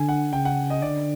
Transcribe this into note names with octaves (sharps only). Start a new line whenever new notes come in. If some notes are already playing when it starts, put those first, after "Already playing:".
Already playing: D3 G#5
F#5
C#3 G5
F#5
D#5
D3 D5